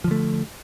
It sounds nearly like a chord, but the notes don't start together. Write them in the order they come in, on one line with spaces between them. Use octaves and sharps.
F3 D3 A3